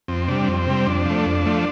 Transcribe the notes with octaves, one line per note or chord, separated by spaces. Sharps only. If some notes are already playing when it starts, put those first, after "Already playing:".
F2 C4
C3 G3 D4
F2 C4
C3 G3
F2 D4
F3 A3
F2
F3 A3